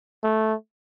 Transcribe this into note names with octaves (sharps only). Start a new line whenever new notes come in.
A3